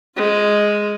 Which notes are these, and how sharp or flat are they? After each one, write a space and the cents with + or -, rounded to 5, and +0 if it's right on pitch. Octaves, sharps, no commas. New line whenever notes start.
G#3 +0 F4 +5